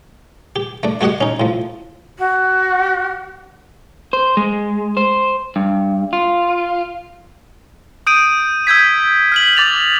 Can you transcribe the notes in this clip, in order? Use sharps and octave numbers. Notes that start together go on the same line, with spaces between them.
G4
A3 D4
A3 F#4 G4 D#5 F#5
C#4 D#4
A2 F3
F#4
C5
G#3
C5
G2
F4
D#6 G6 D7 D#7
E6 G6 G#6 B6
F6 B6 F#7
D6 A6 F7